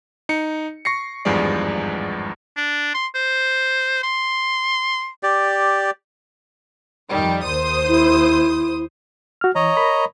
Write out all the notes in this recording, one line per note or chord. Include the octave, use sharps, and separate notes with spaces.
D#4 C#7
C#6 A#6 C7 C#7
G#1 E2 G2 F3 G#3 D5
D4
C6
C5
C6
G4 D5
F2 D#3 G3
D#2 C5 D#6
E4
F#4 F6
E3 C#5 D#5 A#5
A#4 B5